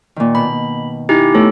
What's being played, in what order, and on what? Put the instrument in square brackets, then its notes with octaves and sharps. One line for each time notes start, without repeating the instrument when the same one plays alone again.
[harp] A#2 D#3
[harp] B2 [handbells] B5
[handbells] D#4 E4 G4 [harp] G#5
[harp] A3 B3 C#5 [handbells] A4